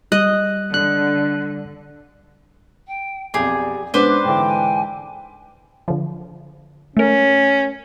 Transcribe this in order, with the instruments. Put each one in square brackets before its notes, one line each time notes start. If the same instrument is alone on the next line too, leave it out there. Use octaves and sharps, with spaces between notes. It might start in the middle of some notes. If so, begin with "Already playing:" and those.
[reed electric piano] G3 [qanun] D#5 [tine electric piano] F#6
[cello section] D3 [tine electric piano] F#6
[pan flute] G5
[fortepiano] B1 F2 [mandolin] G4 G#4 [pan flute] D5
[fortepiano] G#2 B3 C#4 [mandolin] D4 B4 C5 [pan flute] D6
[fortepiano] G#2 D3 E3 [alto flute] G5
[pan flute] G#5
[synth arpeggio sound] D3 F3
[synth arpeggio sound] A3 A#4 [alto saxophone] C#4